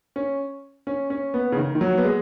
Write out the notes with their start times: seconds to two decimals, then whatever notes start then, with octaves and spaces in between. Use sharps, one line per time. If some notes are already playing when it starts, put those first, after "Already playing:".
0.16 C#4
0.87 C#4
1.10 C#4
1.34 B3
1.52 C#3
1.58 D#3
1.75 D#3
1.81 F#3
1.98 B3
2.04 G#3